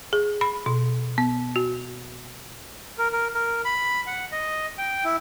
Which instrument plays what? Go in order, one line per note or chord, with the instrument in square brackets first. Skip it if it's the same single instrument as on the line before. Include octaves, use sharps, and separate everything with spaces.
[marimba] G#4
B5
B2
B3
F#4
[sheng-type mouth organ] A#4
A#4
A#4
B5
F#5
D#5
G5
E4